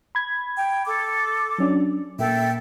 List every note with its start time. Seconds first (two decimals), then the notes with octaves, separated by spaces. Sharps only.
0.15 B5 G#6
0.57 G5
0.86 A4 D6
1.58 F#3 C#4 D4
2.19 A#2 A#3 A4 E5 G5